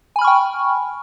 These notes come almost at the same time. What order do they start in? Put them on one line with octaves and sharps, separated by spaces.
G#5 B5 F6 C#6 G5